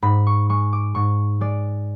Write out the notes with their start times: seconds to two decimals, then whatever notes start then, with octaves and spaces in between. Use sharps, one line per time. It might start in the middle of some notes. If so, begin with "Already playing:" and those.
0.02 G#2 B5
0.27 C#6
0.49 G#3 C#6
0.73 D6
0.95 G#2 C#6
1.41 G#3 D5